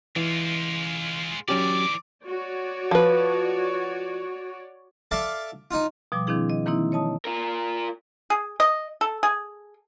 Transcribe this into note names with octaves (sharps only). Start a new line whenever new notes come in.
E3 G#3 F4
E3 F#3 C#4 G4 D5 D6
F#4 C#5 D5
F3 B4
A4 D5 E5 F5 A5
D#4 F4
B2 F3 G3 D6
D#3 F3 C4 D4 E4 G#4
D#5
D#3 E3 A#3 C4 D#4 E4
C#5 D#5 A5 D#6
F4 A#4
G#4
D#5
A4
G#4